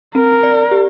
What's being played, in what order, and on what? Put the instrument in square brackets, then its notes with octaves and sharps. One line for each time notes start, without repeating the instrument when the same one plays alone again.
[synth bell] C4 [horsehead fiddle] A#4
[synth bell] D5
G4